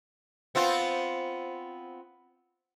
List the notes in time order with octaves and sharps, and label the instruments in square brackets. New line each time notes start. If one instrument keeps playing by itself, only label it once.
[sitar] B3 C4 F4